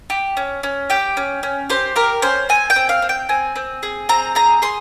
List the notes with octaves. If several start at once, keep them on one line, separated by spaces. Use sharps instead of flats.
G4
C#4
C#4
G4 G5
C#4
C#4
G4 C5
G4 A#4
C#4 C5
C4 G#5
G5
C4
F5
C4
G5
C4 G#5
C4
G#4
C4 A#5
G#4 A#5
G#4 C6